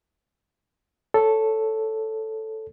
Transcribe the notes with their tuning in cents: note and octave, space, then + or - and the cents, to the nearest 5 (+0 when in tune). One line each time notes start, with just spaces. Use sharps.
A4 +0 C#5 +0